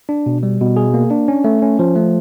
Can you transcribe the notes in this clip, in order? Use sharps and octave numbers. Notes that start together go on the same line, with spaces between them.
D4
B2
G3
B2
G#4
A#3
D4
C#4
A3
C#4
F3
A3